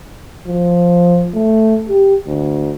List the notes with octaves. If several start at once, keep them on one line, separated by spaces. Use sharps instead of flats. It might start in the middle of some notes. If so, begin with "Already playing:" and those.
F3
A3
G4
D2